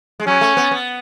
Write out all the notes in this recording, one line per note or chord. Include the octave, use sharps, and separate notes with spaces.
G#3
F#3 C#4
A3
B3
B3